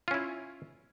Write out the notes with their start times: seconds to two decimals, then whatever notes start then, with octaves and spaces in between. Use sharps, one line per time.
0.08 F4
0.11 C#4
0.14 E4